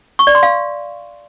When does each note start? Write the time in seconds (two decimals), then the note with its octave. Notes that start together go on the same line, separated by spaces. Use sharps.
0.19 C#6
0.27 D5
0.35 C6
0.43 F5